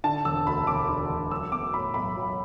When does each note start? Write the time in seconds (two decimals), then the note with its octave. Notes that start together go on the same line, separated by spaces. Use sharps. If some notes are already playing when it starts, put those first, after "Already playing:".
0.04 D3 A5
0.25 E1 E6
0.47 D2 B5
0.67 E1 D6
0.89 D3
1.09 E1
1.31 F#3 E6
1.52 B3 D6
1.73 A2 B5
1.94 B1 B5
2.16 F#3